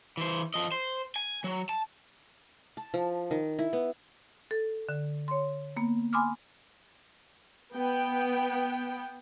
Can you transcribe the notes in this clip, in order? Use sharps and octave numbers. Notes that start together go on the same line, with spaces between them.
E3 C5
F3 D#5
C5
G#5
F#3
A5
A5
F3
D#3
E4
B3
A4
D3
C#5 C6
A#3 B3
G#5 B5 C6 D6 D#6 F6
B3 G5